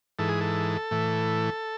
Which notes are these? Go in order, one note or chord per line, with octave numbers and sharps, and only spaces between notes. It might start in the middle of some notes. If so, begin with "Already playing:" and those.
G#2 E3 A4
G#4
A4
A2 E3